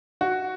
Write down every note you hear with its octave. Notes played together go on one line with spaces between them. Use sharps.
F#4